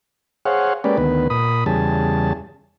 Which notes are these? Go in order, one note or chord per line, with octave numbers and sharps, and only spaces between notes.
G#4 C5 C#5 F5 F#5
G#3 A#3 C#4 G4 B4 D5
D2 D#3 B3 B4
A#2 B5 D#6
E2 C#3 G3 G#4 A5